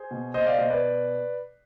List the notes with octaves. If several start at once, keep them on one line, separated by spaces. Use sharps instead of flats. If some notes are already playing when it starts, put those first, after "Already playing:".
Already playing: G#4 C5
B2
B2 C5 D#5
D5 F5
B2 C5 D#5
B4 D5